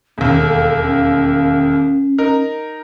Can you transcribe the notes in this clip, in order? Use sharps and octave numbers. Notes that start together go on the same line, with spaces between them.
E1 D#2 C#4
A4
C#4
D#4 A#4